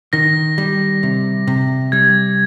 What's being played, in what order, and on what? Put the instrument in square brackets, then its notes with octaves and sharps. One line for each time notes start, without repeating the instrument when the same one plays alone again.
[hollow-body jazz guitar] D#3 [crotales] A#6
[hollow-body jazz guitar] G3
C3
C3
[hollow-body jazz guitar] G3 [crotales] G#6